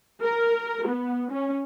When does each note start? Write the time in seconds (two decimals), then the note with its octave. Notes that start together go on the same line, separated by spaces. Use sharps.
0.22 A#4
0.87 B3
1.31 C#4